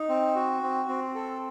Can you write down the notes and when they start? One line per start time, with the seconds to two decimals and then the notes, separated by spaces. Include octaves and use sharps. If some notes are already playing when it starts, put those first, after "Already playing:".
Already playing: D#4
0.09 C4
0.35 F#4
0.63 C4
0.89 C4
1.15 A4